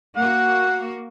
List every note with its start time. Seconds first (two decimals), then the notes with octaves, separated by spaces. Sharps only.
0.17 A#3 F#4 F#5